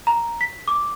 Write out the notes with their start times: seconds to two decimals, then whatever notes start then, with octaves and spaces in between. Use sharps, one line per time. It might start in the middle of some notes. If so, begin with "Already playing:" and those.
0.07 A#5
0.41 B6
0.68 D6